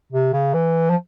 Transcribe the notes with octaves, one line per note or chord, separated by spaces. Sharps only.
C3
C#3
E3
F3